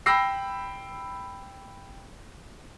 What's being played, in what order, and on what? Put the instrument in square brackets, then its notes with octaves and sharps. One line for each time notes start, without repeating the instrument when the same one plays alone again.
[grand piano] G5 B5 E6 A#6 C7